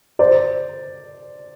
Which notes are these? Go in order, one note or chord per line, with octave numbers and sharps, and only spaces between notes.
C5 D5